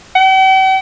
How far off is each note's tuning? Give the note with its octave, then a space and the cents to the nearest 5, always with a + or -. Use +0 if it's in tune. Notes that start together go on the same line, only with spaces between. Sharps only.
G5 -45